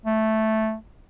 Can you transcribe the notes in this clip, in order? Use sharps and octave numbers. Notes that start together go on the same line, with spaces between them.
A3